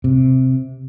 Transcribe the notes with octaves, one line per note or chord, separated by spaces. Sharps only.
C3